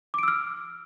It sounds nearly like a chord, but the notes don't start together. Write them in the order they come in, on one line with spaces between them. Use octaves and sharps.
D6 D7 E6 F6